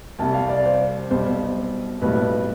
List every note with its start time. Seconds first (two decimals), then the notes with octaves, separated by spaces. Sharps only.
0.19 C2 C3 G3 A5
0.34 F5
0.49 D5
0.65 C5
1.11 B1 B2 G3 C5
2.02 B1 A2 G3 B4